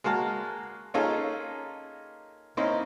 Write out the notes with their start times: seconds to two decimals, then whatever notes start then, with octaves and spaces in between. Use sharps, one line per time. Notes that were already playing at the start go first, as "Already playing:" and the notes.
0.04 G#3 A#3 F#4 A5 F6
0.94 A#3 C#4 D#4 F4 G#4 A4
2.57 A#3 C4 C#4 D#4 E4 D#5